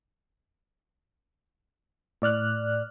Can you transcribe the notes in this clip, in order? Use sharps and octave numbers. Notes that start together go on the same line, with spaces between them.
A2 D5 F6 F#6